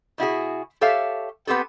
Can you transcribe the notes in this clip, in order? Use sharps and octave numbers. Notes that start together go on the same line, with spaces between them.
B2 E4 F#4 G#4
G4 A4 C#5 E5 F5
B3 C4 G4 A4